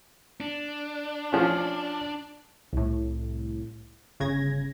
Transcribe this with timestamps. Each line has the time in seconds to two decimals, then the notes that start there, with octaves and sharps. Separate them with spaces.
0.40 D4
1.32 F3 C#4
2.73 C2 A2
4.20 G1 C#3 G#6 A#6